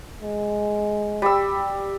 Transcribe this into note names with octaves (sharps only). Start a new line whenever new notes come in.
G#3
G3 E6